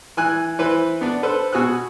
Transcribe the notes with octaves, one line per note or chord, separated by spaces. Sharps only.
E3 G#5 F#6
E3 B4 C5
B3 D4
A4 B4 C5 E6
B2 F#4 G#5 D#6 E6 F#6